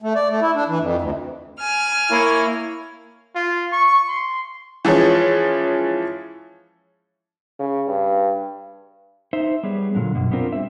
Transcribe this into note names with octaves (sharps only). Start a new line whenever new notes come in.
A3
D5
A3
E4
D4
E3
F2
D2
G#5 F6
A#3 E4 C#5
F4
C#6
C6
E3 F3 G#3 C#4
C#3
G2
D#4 C5 E5
G3 B3 G#4 C#5
A#2 D3 F#3
F#2 B2
B3 C4 D4 F4 A#4 C5
G3 C4 E5